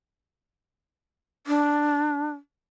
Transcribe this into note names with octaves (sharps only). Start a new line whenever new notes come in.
D4